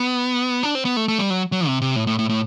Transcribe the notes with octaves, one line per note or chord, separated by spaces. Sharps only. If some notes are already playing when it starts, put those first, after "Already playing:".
Already playing: B3
D4
C4
B3
A3
A3
G3
F#3
F#3
C3
C3
A2
A2
A2
A2